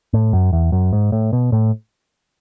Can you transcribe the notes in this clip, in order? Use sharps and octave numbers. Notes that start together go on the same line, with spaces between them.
A2
F#2
E2
F#2
G#2
A2
B2
A2